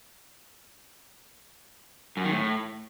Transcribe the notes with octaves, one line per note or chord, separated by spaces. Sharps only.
F#2
D#3
A2